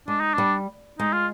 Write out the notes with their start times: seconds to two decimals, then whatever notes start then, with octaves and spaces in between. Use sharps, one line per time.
0.08 G#3 D4
0.20 D#4
0.34 G3 D4
0.99 G#3 D#4
1.13 F4